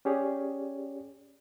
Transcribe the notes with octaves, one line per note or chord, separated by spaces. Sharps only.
C#4 G4 G#4 C#5 D5